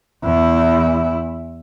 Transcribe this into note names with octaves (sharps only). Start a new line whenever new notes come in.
E2 E4